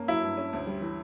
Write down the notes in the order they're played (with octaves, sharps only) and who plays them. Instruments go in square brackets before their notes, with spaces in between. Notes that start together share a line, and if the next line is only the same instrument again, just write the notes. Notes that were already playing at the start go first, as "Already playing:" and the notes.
Already playing: [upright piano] G2 A#3 C#4
[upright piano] F#3 [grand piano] E4
[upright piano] G2
C#4
D2
G3
E3